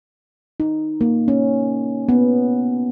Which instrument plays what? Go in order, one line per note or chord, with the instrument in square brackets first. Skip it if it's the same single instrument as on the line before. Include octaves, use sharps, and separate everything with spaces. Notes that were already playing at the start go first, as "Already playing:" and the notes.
[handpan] D#4
A#3
C#4
B3